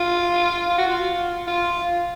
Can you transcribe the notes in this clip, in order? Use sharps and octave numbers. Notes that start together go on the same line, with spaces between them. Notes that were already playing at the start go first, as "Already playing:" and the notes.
Already playing: F4
F4
F#4
F4
F4